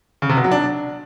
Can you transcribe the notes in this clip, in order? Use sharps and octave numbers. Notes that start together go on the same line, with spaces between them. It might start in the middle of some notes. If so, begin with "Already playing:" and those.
C#3
C3
B2
F#3
D4